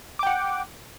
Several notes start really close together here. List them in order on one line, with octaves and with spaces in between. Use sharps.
D6 G5 F#5